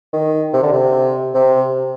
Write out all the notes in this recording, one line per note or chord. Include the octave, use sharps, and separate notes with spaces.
D#3
C3
D3
C3
C3